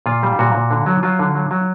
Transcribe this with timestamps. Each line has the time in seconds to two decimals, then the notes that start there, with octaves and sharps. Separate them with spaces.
0.06 A#2 F4
0.23 G3
0.39 A#2 F#4
0.55 A#2
0.71 D3
0.86 F#3
1.03 F#3 F4
1.19 D3
1.35 F#3
1.51 F#3